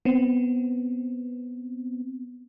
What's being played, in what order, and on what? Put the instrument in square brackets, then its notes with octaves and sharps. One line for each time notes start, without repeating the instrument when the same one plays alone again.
[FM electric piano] B3 C4